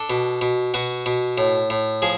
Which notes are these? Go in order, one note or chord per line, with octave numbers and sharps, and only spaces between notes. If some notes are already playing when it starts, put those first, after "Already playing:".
Already playing: D4 A4
B2
B2
B2 F#4
B2
A2
A2
F3 G#4